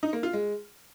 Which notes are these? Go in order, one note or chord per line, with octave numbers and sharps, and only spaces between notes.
D#4
A#3
F4
G#3